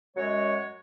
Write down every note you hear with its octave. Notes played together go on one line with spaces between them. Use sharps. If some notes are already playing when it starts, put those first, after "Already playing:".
F#2 F#3 G#3 C#5